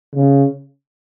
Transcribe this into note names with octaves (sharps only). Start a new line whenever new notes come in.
C#3